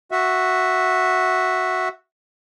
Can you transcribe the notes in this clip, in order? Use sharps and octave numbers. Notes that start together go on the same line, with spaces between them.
F#4 E5